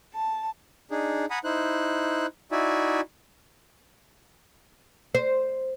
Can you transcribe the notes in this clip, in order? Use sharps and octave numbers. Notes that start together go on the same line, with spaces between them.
A5
D4 D#4 G#4
F#5 G#5 A#5 B5 D#6
D#4 E4 C5 F#6
D#4 E4 F#4 D5 E5 G#5
C5